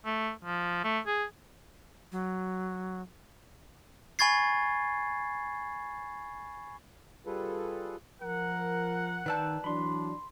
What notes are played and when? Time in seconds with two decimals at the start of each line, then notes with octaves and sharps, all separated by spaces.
0.05 A3
0.45 F3
0.84 A3
1.07 G#4
2.12 F#3
4.19 G#5 B5 C#6 G#6 A6 C7
7.26 G3 F4 G#4 A4 B4
8.21 F3 A#4 F#5
9.26 D#3 B4 D5 A5 E6 G6
9.64 E3 F#3 D4 B5 C6